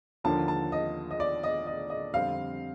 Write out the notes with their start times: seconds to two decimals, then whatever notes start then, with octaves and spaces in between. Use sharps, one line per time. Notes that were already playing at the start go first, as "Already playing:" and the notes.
0.24 D#2 D3 F3 A#3 D4 A5
0.48 A5
0.72 D#5
1.11 D#5
1.20 D5
1.43 D#5
1.67 D#5
1.90 D#5
2.14 F2 D3 G3 C4 F5